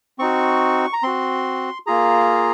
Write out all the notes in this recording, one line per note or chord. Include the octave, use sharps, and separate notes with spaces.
C4 D#4 F#4 C#6
A#5
C4 F#4 C6
A#3 F4 G#4 A#5